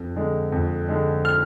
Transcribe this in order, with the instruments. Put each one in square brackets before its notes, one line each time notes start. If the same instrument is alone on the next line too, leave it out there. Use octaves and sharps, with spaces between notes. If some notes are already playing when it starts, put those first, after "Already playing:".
Already playing: [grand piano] F2
D3 G#3
F2
D3 G#3
F6